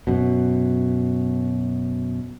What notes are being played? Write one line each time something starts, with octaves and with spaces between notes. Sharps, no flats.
F#2 B2